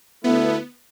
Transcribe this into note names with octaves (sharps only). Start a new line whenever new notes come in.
D2 D3 A3 B3 E4